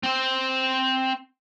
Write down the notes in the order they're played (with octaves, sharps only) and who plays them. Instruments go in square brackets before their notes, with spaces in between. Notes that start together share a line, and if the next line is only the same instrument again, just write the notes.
[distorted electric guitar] C4 C5